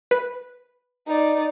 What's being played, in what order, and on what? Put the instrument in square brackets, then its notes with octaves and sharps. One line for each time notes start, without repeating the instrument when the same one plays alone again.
[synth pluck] B4
[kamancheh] D#4 D5